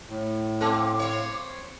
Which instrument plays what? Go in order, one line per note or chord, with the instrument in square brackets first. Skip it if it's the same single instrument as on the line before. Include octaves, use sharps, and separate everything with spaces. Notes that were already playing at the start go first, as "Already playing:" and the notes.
[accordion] A2
[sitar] C4 [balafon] A4 A5 [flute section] F5 D6
[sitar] C4 C#5